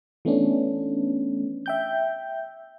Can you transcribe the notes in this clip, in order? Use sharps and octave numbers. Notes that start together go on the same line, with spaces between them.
E3 A3 B3 C#4 D4
E5 G5 G6